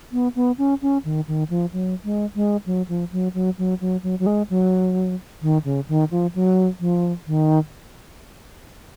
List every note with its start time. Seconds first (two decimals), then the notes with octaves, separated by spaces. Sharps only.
0.12 B3
0.36 B3
0.58 C#4
0.82 C#4
1.05 D#3
1.28 D#3
1.50 F3
1.73 F#3
2.04 G#3
2.35 G#3
2.66 F#3
2.88 F3
3.12 F#3
3.34 F#3
3.58 F#3
3.81 F#3
4.03 F#3
4.19 F#3
4.26 G#3
4.50 F#3
5.42 D#3
5.64 C#3
5.88 D#3
6.11 F3
6.35 F#3
6.80 F3
7.27 D#3